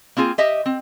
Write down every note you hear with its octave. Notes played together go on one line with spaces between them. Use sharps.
A#3 C4 F4 G#4
G4 D#5 E5
C4